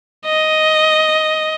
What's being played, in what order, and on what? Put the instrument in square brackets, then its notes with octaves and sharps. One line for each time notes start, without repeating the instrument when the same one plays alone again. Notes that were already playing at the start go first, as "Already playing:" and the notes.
[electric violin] D#5